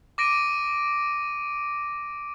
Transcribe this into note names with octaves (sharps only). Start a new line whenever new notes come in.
D6 A#6 D7 D#7